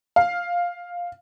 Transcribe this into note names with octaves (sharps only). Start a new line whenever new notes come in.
F5